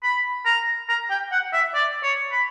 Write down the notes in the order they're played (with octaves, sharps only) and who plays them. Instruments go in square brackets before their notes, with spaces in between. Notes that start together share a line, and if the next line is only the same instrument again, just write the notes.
[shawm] B5
A#5
A#5
G5
F#5
E5
D5
C#5
B5